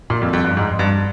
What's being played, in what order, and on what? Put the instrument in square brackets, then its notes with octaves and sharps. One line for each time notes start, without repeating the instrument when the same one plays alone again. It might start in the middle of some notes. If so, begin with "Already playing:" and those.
[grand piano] A#2
F2
F2
G2
G#2
G2